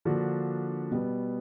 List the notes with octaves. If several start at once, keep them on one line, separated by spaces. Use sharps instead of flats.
D3 F3 A#3 D4 F#4
B2 G3 B3